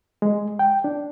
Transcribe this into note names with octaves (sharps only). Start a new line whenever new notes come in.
G#3
G5
D4